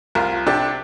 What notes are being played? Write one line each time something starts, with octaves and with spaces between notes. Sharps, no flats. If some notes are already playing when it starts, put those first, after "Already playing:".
C2 F4 A#4
C3 D4 G4